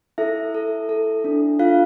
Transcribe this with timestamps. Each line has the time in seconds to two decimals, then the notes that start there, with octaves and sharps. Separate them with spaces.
0.18 E4 A4 E5
0.54 A4
0.89 A4
1.24 D4
1.59 F4 F5